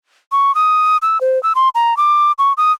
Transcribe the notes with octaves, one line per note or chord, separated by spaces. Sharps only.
C#6
D#6
E6
C5
E6
C6
A#5
D6
C#6
D#6